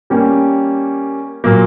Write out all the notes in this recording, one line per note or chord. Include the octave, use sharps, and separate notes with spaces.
G3 A#3 C#4
A#2 F#3 A#3